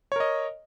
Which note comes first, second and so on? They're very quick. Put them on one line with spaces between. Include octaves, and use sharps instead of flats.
C#5 A#4 D#5